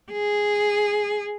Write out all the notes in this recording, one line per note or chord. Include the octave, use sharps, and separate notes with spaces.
G#4